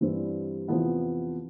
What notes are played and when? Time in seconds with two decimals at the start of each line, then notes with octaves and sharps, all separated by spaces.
0.01 G2 E3 G3 C4
0.68 E2 C3 F3 B3 E4